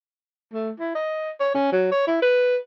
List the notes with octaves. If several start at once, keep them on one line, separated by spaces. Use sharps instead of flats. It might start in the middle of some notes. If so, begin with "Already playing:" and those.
A3
E4
D#5
C#5
C#4
F#3
C#5
E4
B4